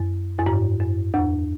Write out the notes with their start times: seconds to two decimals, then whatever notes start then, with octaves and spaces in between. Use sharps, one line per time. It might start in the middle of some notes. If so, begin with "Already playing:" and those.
Already playing: F#2
0.38 F#2
0.46 G#2
0.80 F#2
1.14 E2